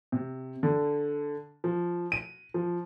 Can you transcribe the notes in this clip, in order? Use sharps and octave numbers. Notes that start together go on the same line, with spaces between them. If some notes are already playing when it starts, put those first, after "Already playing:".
C3
D3
F3
D#7
F3